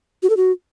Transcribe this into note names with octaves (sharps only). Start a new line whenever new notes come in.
F#4
A4
F#4